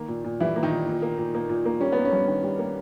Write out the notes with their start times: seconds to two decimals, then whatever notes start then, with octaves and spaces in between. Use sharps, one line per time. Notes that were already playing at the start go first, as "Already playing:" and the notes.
Already playing: D#3 A#3
0.08 A#2
0.24 A#2
0.40 E3 G3 E4
0.56 A#3
0.63 D#3 D#4
0.71 A#2
0.87 A#2
1.02 A#3
1.18 A#2
1.34 A#3
1.49 A#2
1.66 A#3
1.80 G3 C#4
1.92 A#3 B3
2.05 C#4
2.12 G2
2.27 D#3
2.43 G3
2.59 A#3